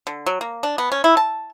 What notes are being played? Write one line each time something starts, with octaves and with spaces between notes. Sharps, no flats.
D3
F#3
A#3
D4
B3
C#4
E4
A5